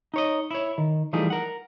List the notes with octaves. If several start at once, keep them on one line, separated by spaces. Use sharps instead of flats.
D#4 C#5 D#5
E4 C#5
D#3
E3 F3 G3 A3 D#4 G#4
A#4 F#5